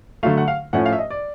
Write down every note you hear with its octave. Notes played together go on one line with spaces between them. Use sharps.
D3 F#3 A3 F5
F#5
F5
A2 F3 A3 C#4 F#5
F5
E5
D#5
D5